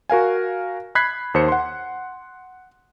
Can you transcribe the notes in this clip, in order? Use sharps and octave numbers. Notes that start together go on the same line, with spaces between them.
F#4 A#4 F5 G#5
B5 F#6 G#6 B6 C7
D#2 C5 C#7
F#5 C6